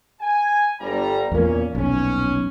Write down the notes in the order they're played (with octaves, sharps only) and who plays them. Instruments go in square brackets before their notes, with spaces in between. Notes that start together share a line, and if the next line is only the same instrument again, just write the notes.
[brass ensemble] G#5
G1 G3 A#5
[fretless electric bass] E2 A#3 [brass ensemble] A#2 C#4
[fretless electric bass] D#1 B1 [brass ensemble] C#4